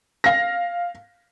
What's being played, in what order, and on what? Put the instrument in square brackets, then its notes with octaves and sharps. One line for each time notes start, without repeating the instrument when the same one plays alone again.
[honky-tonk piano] F5 A#6